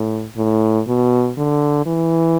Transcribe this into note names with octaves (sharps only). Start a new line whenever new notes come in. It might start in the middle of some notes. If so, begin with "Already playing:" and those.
Already playing: A2
A2
B2
D3
E3